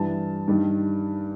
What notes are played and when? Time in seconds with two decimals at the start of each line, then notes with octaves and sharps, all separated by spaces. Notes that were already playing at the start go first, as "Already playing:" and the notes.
Already playing: G2 E3 G3 A5
0.48 G2 D#3 G3